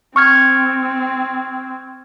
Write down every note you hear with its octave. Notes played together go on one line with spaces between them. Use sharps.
C4 C#6 F6 G#6